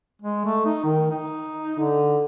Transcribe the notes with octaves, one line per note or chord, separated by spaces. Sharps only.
G#3
A3
D#4
D#3
D#4
D3